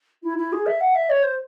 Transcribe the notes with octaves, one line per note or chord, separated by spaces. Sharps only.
E4
E4
G#4
E5
F#5
E5
C#5
C5